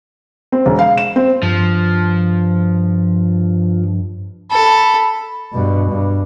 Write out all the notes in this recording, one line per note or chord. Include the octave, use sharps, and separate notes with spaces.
C4
E1
F5
E7
C4
G2 F3
A4 B5
G2 B2
G2